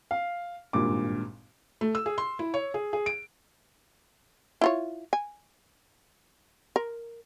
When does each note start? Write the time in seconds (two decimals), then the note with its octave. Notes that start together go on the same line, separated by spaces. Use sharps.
0.11 F5
0.73 G#1 G2 A#2 D6
1.81 A3
1.95 E6
2.06 G#4
2.18 C6
2.39 E4
2.54 C#5
2.74 G#4
2.93 G#4
3.06 D7
4.61 E4 F4 C#5
5.13 G#5
6.76 A#4